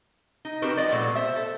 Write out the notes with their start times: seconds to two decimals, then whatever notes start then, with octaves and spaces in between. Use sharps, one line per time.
0.45 D#4
0.62 C4 D#4 F#4 G4 A#4 B4
0.76 F3 D5 D#5
0.89 A#2 G#3 A3 B3
1.16 C5 E5
1.36 A4